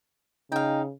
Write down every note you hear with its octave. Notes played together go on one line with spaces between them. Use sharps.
C#3 D#4 F5 G5